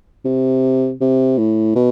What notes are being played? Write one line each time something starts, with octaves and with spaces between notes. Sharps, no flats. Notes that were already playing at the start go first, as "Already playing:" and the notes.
C3
C3
A2
B2